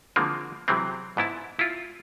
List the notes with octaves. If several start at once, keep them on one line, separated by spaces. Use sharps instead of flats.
D3 E3 F3 G#3 A#3 C4
C3 E3 F#3 G#3 C4
G#2 B3 E4 A5
E4 F4